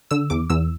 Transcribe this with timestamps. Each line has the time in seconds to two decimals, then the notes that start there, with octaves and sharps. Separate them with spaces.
0.11 D3 E6
0.30 E2 D6
0.50 E2 E6